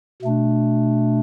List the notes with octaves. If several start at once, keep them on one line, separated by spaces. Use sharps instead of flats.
B2 A3 D4